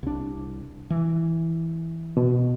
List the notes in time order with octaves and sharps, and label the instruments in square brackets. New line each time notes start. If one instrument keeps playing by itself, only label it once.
[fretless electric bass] C2 D4
E3
[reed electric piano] B2